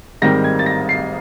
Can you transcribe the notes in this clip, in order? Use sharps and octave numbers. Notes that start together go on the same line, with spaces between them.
G#2 D#3 G3 C4 A#6
G#6
A6
A#6
C7